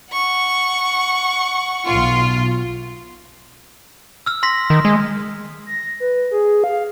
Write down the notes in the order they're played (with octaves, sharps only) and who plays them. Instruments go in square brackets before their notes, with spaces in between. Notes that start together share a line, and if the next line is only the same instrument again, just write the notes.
[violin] F#5 C#6
[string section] B1 F4
[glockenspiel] E6 F6
C6 A#6 B6
[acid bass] D#3
G#3
[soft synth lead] A#6
B4
G#4
F5